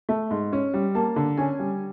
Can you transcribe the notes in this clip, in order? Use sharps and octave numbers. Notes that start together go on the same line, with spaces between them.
A3
G#2
C#4
G3
A#3 A5
D3
C#4 G#5
G3